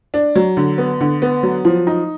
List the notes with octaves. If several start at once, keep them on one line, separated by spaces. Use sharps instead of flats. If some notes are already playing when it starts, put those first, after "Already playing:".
D4
F#3
D3
B3
D3
B3
F#3
F3
D#4